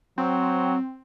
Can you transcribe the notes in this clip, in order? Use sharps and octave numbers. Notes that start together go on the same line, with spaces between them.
F#3 C4